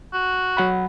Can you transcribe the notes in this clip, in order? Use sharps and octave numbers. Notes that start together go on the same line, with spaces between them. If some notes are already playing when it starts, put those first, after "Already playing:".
F#4
F#3 F#5 B5